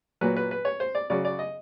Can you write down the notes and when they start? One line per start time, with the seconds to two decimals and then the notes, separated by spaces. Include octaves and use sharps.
0.21 A#2 F#3 B4
0.37 B4
0.51 B4
0.65 C#5
0.80 C5
0.95 D5
1.10 C#3 F#3 D5
1.25 D5
1.39 D#5